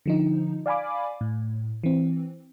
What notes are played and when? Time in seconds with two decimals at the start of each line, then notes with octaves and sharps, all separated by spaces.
0.06 D3 F3 D#4
0.66 D5 F5 G#5 B5 D6
1.21 A2
1.83 E3 C4